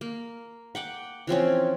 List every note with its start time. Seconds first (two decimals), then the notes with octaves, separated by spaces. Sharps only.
0.01 A#3
0.75 F#5 G5 D6
1.27 E3 F3 C4 C#4